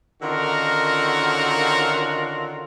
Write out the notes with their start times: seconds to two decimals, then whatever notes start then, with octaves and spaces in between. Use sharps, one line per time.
0.22 D3 D#3 C#4 F4 F#4 A#4